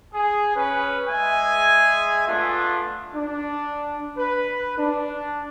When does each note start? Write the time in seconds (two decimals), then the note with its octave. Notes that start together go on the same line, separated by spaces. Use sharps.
0.13 G#4 G#5
0.55 C#4 B4
1.07 G#3 G#4 E5 G#5
2.27 A3 B3 D4 F4
3.15 D4
4.17 B4
4.78 D4